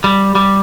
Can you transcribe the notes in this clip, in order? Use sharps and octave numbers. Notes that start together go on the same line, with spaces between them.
G3
G3